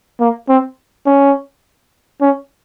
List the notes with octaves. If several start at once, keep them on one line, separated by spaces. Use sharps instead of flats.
A#3
C4
C#4
C#4